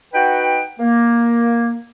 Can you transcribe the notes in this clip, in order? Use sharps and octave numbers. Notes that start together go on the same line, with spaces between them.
D#4 F#4 B4 F#5 G5
A#3